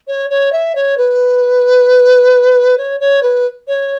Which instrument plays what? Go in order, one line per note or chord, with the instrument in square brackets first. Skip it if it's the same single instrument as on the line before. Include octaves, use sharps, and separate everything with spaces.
[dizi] C#5
C#5
E5
C#5
B4
C#5
C#5
B4
C#5